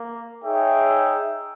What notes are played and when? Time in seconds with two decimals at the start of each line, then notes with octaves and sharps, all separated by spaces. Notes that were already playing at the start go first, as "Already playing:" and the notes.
Already playing: A#3
0.44 D#4 G#4 C#5 E5 G5